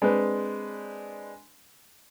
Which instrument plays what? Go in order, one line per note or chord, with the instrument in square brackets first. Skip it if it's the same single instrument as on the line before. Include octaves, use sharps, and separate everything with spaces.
[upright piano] G#3 C4 D4 B4